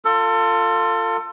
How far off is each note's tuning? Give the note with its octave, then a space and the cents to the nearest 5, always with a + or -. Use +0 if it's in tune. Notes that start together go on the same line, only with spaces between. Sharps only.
F4 +0 A4 +30